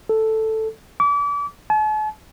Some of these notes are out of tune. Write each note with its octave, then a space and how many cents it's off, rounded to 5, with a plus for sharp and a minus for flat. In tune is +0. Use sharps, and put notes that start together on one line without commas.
A4 +0
D6 -35
A5 -45